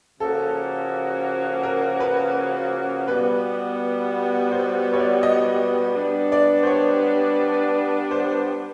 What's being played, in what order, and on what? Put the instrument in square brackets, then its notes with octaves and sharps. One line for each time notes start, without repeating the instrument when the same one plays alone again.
[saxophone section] C#3 F3 A#3 C#4 F#4 [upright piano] A4
[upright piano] A#4
B4
[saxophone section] B2 G3 B3 [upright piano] B4
[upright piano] C5
C#5
D5
D#5
[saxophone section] G3 B3 D4
[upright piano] D5
C5
C#5
C5